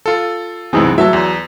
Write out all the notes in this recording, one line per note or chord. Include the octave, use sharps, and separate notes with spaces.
F4 A4
C2 F#2 E3 G#3 C4 D#4
F#3 E5 A5
E2